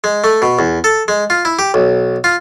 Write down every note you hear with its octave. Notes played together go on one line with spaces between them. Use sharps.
G#3
A3
B2
E2
A4
G#3
F4
E4
G4
B1
F4